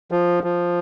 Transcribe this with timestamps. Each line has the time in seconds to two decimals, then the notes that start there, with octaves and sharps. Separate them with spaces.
0.11 F3
0.44 F3